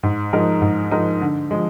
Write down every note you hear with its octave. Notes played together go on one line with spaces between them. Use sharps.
G#2
F3 G#3 D#4 A#4
G#2
F3 G#3 D#4 A#4
D3
F3 G#3